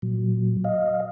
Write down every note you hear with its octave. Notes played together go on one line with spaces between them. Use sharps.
A#2 F#3
D#5 F5